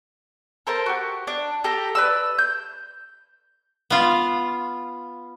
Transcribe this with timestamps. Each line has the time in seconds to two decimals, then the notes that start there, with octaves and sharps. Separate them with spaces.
0.67 A4 A#4 C5 A5
0.86 F#4 G4
1.27 D4
1.64 G4 A4 A#5
1.95 B4 D5 E6
2.38 G6
3.90 B3 F4